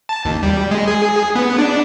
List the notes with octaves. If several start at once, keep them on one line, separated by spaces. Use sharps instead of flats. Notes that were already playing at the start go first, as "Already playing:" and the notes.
A5
D#2
G3
G#3
G#4
B3
D4